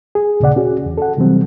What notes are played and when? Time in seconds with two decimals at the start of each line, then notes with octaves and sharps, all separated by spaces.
0.15 G#4
0.40 D#2 A#2 C#3 D5 F#5
0.56 C#4 F#4 G#4
0.86 E2
0.98 A4 F#5
1.17 C3 E3 F#3 G3 C4